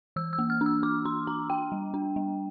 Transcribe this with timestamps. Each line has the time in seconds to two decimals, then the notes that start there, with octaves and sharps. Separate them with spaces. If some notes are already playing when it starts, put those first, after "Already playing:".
0.16 E3 E6
0.33 E6
0.39 A#3
0.50 F6
0.61 D4
0.66 E6
0.83 D4 D6
1.05 D4 C6
1.27 D4 A#5
1.50 D4 G5
1.72 G3
1.94 D4
2.16 G3